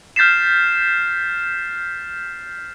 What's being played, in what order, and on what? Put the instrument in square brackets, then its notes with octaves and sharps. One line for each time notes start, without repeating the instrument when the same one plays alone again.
[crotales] F6 G6 A6 B6 C7 E7